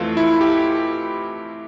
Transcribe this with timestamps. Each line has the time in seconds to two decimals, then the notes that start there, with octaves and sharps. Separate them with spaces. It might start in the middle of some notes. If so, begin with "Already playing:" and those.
Already playing: F2 E3 A3 F4 A4
0.17 E4
0.41 G4